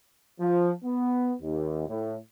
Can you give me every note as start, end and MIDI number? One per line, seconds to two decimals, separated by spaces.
0.40 0.72 53
0.84 1.34 59
1.42 1.88 39
1.88 2.15 45